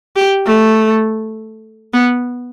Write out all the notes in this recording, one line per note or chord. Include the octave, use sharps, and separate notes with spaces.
G4
A3
B3